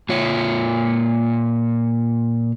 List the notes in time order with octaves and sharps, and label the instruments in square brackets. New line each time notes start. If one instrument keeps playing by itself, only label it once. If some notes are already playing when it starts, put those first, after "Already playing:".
[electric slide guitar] A#2 F4 C#5